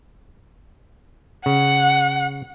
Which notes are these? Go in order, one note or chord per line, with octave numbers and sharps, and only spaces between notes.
C#3 F#5